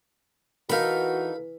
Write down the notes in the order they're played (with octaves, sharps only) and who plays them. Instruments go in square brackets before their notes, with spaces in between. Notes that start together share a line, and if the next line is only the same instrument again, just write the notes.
[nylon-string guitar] E3 [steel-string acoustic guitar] D#4 A4 A#4 [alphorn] F#4 [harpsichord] F5 B5